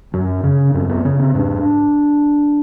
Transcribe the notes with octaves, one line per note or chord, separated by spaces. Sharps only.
F#2 C#4
C#3 C#4
F#2 C4
B3
C#3 C#4
C4
G#2 D4